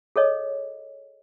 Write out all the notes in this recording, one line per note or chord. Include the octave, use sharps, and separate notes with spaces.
G#4 A4 C#5 D#5